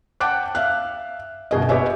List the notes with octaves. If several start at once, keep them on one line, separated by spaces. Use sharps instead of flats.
F#5 G5 A5 D6 F#6
E5 F5 F#6
G1 B2 G#4 D#5
B3 G4 C#5 D#5 E5 G#5